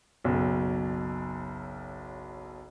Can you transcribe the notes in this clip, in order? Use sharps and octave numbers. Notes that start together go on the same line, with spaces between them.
F#1 B1